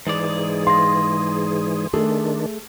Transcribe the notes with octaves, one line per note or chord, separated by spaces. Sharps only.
G#2 E3 G#4 D5
F5 C6 A#6
D#3 A3 D4 G#4 A4